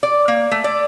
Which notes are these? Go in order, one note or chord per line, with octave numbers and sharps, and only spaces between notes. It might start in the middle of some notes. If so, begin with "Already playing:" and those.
D5
A#3
A3
D5